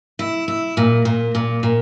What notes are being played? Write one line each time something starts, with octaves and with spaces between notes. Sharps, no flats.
E4
E4
A#2
A#2
A#2
A#2